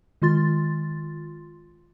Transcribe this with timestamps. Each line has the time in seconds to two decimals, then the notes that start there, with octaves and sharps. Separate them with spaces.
0.22 D#3 G#3 F4 C6 A6